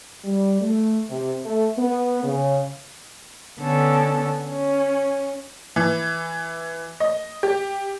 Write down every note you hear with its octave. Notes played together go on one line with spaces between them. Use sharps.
G3
A3
C3
A3
B3
C#3
D3 B3 C#4 A4
C#4
E3
D#5
G4